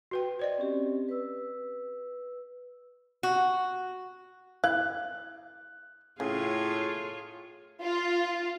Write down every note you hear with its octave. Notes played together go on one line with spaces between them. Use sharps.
F#4 B4 G5
C5 D5 D#5
C4 C#4 G4
B4 E6
F#4
E4 F5 F#6
A2 C#3 F4 G#4 C#5
F4